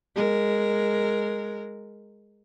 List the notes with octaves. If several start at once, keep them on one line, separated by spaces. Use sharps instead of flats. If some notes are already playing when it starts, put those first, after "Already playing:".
G#3 A#4